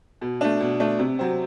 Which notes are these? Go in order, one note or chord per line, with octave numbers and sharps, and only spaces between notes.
B2
A3 D4
B2
A3 D4
C3
F#3 C4